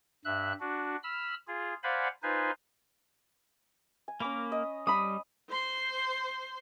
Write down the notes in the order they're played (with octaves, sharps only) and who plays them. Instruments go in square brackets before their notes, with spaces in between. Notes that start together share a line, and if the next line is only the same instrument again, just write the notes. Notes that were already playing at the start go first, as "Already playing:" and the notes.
[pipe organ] G2 E5 F#6
D4 F#4
B5 E6 F6
F4 G#4
C5 D5 F5 F#5 G#5 B5
D#4 F4 B4 C5 G#5
[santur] G#5
[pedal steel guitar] A#3 A#4 D6 [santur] C#4 B5
[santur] D#5
[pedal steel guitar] G3 [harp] B5 D#6
[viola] C5 C6